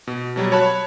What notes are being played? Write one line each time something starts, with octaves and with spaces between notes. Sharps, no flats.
B2
B2 F#3 G3
C#5 A5 B5 F#6